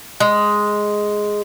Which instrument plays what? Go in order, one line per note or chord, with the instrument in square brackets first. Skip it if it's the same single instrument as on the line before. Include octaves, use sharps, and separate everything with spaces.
[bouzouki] G#3